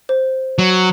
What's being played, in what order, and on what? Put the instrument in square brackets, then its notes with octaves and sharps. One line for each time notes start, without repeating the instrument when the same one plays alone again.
[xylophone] C5
[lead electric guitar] F#3